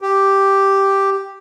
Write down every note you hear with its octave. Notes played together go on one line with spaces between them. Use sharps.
G4